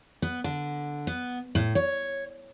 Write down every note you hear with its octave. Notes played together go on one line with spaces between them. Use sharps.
B3
D3
B3
A2
C#5